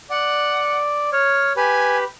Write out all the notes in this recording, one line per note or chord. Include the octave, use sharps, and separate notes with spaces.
D5 F#5
C#5 F6
G4 B4 G#5